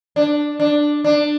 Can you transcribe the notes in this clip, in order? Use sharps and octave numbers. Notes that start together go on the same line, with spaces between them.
D4
D4
D4